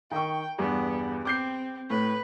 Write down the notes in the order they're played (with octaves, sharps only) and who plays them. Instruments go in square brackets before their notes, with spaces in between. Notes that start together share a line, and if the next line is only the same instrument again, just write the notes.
[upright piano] D#3 C#6 [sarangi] G5
[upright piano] E2 G2 [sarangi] B3
[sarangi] C4 [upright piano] D6 G6 C7
[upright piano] A2 [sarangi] B4